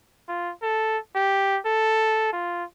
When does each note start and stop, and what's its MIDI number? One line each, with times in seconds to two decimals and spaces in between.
0.28 0.52 65
0.62 0.97 69
1.15 1.59 67
1.65 2.30 69
2.32 2.64 65